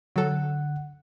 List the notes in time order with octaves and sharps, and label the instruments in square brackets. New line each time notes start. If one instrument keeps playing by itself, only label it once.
[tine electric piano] D3 F#5 [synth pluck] F#3 A4